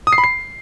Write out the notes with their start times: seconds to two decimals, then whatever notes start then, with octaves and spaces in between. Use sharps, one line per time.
0.07 D#6
0.13 C7
0.18 B5
0.24 C7